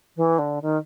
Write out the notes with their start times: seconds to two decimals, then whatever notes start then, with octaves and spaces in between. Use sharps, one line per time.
0.16 E3
0.38 D3
0.62 D#3